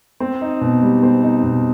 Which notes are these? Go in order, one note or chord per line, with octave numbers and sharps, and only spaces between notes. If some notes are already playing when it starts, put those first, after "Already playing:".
C4
D#4
B2
G3
C4
D#4
B2